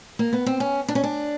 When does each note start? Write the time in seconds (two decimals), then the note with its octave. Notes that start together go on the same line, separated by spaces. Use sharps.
0.19 A#3
0.33 B3
0.46 C4
0.60 C#4
0.88 D4
0.95 C#4
1.04 D4